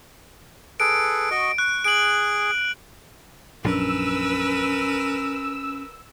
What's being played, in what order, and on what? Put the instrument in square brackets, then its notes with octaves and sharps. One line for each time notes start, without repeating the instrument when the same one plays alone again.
[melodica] G#4 A4 B4 [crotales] D7
[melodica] F#4 D#5 C#6
[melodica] C#6 [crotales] F#6
[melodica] G#4 [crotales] D7 F#7
[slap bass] A#1 F#2 D4 [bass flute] C#4 [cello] A#4 B4 [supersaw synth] E6